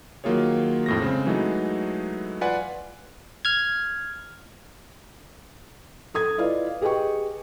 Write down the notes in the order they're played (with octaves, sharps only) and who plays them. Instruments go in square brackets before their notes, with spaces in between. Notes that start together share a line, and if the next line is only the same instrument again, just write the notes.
[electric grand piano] D#3 F#3 A#3 F4 G#4 C#5
F2 A2 A#6
C#3 G#3 C4
E3 F#3 G#3 A3 D#4
F4 B4 D5 F#5 G#5 C6
[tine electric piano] F6 G#6
[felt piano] A4 D#6 G#6
E4 F4 B4 D5 D#5 F5
G4 G#4 B4 D#5 G5 C#6